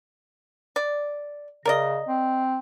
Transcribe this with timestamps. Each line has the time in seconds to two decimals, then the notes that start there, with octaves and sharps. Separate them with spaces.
0.76 D5
1.65 C#3 A#4 D5 D#5
2.08 C4